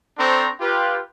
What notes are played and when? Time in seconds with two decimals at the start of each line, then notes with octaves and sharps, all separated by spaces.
0.18 C4 D4 A4 C5 A#5 C#6
0.59 F4 G4 B4